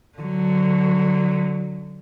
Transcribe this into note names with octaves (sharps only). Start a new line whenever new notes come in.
D3 F#3